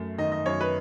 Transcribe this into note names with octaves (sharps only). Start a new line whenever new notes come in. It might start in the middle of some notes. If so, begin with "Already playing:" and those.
Already playing: F#2 A3
D#3 D#5
D#5
F#2 C#5
B4